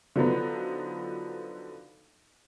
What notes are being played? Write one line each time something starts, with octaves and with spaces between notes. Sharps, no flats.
D3 F3 F#3 B3 D#4